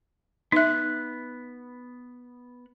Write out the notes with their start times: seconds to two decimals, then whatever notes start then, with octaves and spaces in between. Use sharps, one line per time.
0.52 B3 D#4 E5 F#6